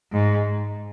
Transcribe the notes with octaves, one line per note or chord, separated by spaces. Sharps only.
G#2